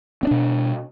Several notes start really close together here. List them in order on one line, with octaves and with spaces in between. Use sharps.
C4 D4 B2